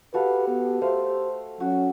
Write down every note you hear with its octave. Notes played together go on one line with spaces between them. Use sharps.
F#4 G4 A4 B4 F5
B3
A3 C5 F5
F#3 C#4 F#4